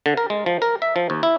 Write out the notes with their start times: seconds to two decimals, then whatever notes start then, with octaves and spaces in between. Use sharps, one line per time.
0.06 D3
0.17 A#4
0.30 G#3
0.46 F3
0.62 A#4
0.82 E5
0.96 F3
1.10 D#2
1.23 E4